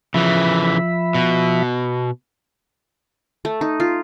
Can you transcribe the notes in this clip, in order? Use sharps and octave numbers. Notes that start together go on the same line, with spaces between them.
C#3 E3 F3 E5 B5
B2
A3
D#4
F4